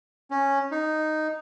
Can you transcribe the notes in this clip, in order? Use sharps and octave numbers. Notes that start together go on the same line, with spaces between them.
C#4
D#4